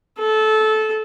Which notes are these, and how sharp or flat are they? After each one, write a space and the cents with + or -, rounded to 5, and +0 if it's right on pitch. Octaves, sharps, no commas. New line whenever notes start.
A4 -20